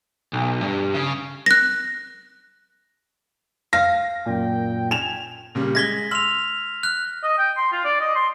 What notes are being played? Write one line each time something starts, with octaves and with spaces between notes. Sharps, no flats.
B1
G2
C#3
F#6 A#6
F5 A#6
F#2 A#2 G5
G#5 E7 F7
A#2 C#3 G3
G#3 G#6 A#6 B6 G7
C6 E6 F6 F7 F#7
F6 F#6
D#5
G5
C6
F4
D5
D#5
C6